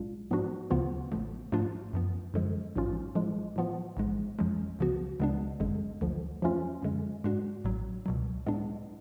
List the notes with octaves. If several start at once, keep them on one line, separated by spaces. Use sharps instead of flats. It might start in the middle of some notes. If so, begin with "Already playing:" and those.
Already playing: B1 A2 G#3 D4 F4
G#2 F3 B3 D4 F#4
D2 C#3 F3 B3 F4
A1 A2 F3 A3
G#2 F3 A3 D4 F4
F#2 F3 B3
F#2 D3 F3 G#3
A1 G#2 F#3 C#4 F4
A2 F3 G#3
A2 F3 B3 F4
A1 G#2 G#3
F2 F3 G#3 C#4
C#2 C#3 F3 B3 F#4
C#2 C#3 G#3 B3 D4
G#1 F#2 D3 G#3
D2 D3 F3
F2 F3 A3 C#4 F4
F#2 D3 G#3
G#2 G#3 D4 F#4
A1 A2 F#3
C#2 B2 F#3
A2 G#3 B3 D4